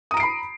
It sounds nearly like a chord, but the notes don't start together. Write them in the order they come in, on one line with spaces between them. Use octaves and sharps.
D#6 A#5 D7 C7 B5